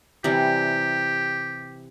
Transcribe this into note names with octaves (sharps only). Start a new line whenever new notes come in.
C3 E3 G3 G4